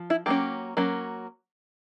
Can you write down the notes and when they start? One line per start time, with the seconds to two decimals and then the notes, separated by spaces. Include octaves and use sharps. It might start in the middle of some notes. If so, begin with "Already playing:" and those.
Already playing: F3
0.10 E4
0.26 F#3 A#3 C#4 G4
0.77 F#3 A#3 C#4